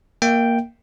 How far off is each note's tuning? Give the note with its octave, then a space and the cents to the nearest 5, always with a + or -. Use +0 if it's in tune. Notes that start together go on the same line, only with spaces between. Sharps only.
A#3 +0 E5 -45 G5 +0